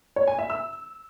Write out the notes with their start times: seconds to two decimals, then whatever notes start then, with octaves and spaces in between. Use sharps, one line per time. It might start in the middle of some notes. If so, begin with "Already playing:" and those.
0.16 C#5
0.27 G#5
0.39 E5
0.50 E6